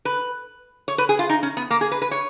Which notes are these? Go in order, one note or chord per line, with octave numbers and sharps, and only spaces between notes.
B4
C#5
B4
G#4
F4
D#4
C#4
B3
A#3
G#4
B4
B4
C#5